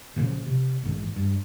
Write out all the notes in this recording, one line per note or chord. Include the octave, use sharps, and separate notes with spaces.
A#2 C#3 E3 F3
C3
A#1 G#2 E3
G2